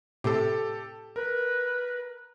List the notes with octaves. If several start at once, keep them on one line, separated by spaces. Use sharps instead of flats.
A2 C3 G4 A4
A#4 B4